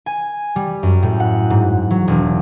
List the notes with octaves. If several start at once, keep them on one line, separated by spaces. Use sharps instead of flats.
G#5
G3
F#2
A2
F#5
G#2
F#3
E1